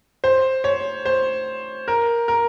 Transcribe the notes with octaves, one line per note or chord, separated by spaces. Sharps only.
C5
C#5
C5
A#4
A#4